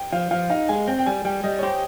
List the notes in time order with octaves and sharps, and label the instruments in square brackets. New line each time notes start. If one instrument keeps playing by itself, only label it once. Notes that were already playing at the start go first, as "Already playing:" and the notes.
Already playing: [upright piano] G5
[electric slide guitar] F3 [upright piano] F5
[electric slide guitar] F3 [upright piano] F5
[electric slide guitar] D#4 [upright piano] F5
[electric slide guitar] G#3 [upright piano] G#5
[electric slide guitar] C4 [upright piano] G5
[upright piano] G5
[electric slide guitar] G3 [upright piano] G#5
[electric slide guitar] G3 [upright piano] G5
[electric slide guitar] G3 [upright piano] D#5
[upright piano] C#5
[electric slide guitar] G4 [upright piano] C5